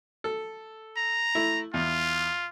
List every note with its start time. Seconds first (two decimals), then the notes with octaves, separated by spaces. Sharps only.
0.24 A4
0.97 A#5
1.35 A3 E4
1.74 E2 F4